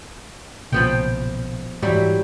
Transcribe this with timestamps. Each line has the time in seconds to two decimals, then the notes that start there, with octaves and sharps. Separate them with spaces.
0.72 B1 A#2 C#3 F3 B3 G5
1.83 G#2 E3 F#3 G3 E4